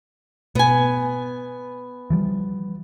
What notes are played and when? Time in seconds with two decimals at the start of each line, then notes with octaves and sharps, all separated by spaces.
0.55 B2 B3 G#5
2.10 E3 F3 G3